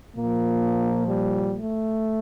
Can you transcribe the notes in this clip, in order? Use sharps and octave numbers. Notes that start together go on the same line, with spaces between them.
A#2 F3 A#3
G3
A3